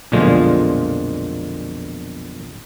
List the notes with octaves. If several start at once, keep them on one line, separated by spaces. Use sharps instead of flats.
B1 F2 A#2 D3 G#3 F4